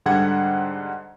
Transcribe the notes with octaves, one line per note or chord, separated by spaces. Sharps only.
G#2 D3 G3 F#5 G#6